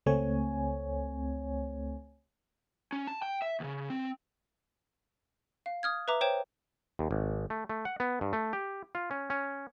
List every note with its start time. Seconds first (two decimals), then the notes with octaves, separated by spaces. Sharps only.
0.06 C#2 A3 C4 C#5 G#5
2.92 C#4
3.07 A5
3.22 G5
3.42 E5
3.60 D2 C#3
3.90 C4
5.66 F5
5.83 D#6 F6 G#6
6.08 B4 E5 A#5 D6
6.21 C5 C#5 G5 E7
6.99 D#2
7.11 G#1
7.50 A3
7.69 A3
7.85 F#5
8.00 B3
8.21 G2
8.33 A3
8.53 G4
8.95 F4
9.11 C#4
9.30 C#4